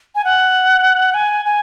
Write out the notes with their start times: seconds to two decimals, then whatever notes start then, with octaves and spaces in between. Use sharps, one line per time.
0.15 G#5
0.24 F#5
1.14 G#5
1.45 G#5